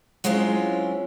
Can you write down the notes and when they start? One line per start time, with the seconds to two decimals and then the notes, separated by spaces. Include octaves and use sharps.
0.24 F#3 G#3 C4 C#4 E4 F4